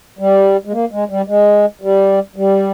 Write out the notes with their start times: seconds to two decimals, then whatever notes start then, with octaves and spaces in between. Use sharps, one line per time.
0.19 G3
0.65 G#3
0.73 A#3
0.91 G#3
1.09 G3
1.27 G#3
1.81 G3
2.36 G3